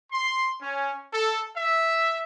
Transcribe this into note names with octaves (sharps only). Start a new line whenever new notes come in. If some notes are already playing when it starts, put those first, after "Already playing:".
C6
C#4
A4
E5